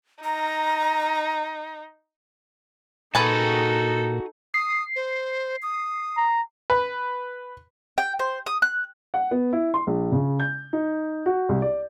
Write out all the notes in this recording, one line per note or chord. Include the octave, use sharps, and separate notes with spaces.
D#4 A#5
A#2 D#4 F#4 G#4 A4 B4 G#5 A5
D#6 C7
C5
D#6
A#5
B4
G5
C5
D#6
F#6
F#5
B3
E4
C6
A#1
C#3
G6
D#4
F#4
C2
D5